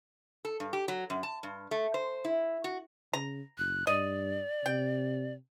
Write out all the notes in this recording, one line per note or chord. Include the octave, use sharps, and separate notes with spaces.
A4
G2
G4
F#3
F#2
A5
G2
A3
C5
E4
F#4
C#3 A#5
F#1 F#6
G2 D5 D#5
C3 G5